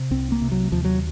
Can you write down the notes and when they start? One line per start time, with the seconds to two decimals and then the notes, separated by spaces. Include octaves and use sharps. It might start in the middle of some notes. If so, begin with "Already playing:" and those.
Already playing: C3
0.11 C2 C4
0.32 A#3
0.42 C3
0.52 F#3
0.72 D#2 F3
0.85 F#3